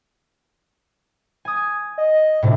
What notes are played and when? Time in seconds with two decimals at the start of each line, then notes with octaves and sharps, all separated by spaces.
1.45 G#5 D#6
1.98 D#5
2.43 A2 C3 D4